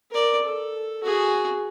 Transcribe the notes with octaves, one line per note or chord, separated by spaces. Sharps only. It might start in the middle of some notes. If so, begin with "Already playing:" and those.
A#4 D5
A4
F#4 G#4